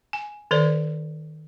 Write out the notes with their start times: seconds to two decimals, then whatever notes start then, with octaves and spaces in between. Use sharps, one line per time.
0.13 G#5
0.51 D#3 A4 C5 D5